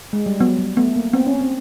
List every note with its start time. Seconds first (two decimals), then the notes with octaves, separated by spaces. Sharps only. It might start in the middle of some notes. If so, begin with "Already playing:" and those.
0.13 G#3
0.26 G3
0.40 F#3 B3
0.59 G3
0.77 A3 B3
0.96 A#3
1.13 B3 C4
1.27 C#4
1.41 C4